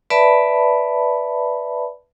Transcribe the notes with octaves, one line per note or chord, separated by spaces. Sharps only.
B4 D5 E5 A5 B5